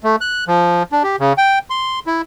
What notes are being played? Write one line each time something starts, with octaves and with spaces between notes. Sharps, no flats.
A3
F#6
F3
D4
G4
C#3
G5
C6
E4